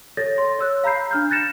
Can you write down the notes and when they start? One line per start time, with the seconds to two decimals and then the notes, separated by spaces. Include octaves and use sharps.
0.17 A4 C#5 A6 A#6
0.38 C6
0.59 C#5 E6 F#6
0.84 F5 A#5 B5 G6 C7
1.11 D4 F6 G6
1.30 F#6 G6 A6 A#6 C#7 E7